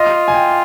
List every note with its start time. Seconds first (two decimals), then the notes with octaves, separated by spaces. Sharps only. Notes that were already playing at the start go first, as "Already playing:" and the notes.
Already playing: F4 D#5
0.28 G#5
0.34 G5